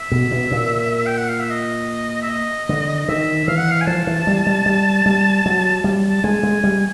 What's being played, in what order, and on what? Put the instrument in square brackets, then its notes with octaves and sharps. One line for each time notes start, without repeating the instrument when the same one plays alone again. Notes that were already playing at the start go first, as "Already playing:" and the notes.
Already playing: [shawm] E5
[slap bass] B2
B2
A#2
[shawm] G5
F#5
F5
E5
D#5
E5
D#5
[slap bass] D3
[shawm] D#5
[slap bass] D#3 [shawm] E5
[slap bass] E3 [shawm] F5
[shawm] F#5
F5
G#5
[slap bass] F3 [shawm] A5
[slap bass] E3
G3
G3
G3
G3
F#3
G3
[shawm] A5
[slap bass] G#3 [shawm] G#5
[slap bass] G#3
G3